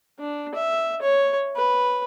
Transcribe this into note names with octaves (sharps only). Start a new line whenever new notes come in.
D4
E5
C#5
B4